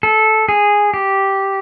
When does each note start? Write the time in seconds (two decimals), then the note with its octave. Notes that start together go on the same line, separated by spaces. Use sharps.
0.03 A4
0.49 G#4
0.94 G4